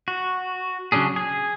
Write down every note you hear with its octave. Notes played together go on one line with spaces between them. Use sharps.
F#4
C#3 F#3 C#4 D4 G#4
G#4 G#5